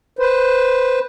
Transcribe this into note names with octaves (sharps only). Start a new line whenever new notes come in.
B4 C5